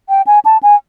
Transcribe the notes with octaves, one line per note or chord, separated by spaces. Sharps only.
G5
G#5
A5
G#5